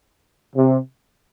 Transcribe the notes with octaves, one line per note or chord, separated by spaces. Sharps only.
C3